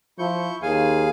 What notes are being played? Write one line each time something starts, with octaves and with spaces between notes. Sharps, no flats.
F3 E4 C#6 G6
D#2 G#4 F5 G#5